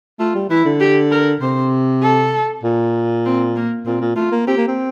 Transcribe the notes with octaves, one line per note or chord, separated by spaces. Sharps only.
A3 F4
G3
E3 E4
D3
G4
A#4
C3 C5
A4
A#2
C4
A#3
A#2 C4
A#2
A3 F4
A#3
C4 G4
A#3
C4